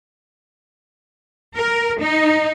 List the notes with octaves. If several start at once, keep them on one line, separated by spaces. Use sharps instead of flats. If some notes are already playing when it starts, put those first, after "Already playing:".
A#4
D#4